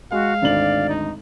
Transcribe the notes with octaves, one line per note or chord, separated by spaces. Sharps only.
G#3 F#4 F5
G#1 D2 D5 F#7
D#4